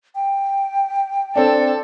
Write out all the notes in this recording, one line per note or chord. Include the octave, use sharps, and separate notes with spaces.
G5
C4 D4 A4